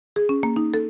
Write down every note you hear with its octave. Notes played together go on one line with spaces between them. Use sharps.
G#4
C#4
A#3
D#4
A4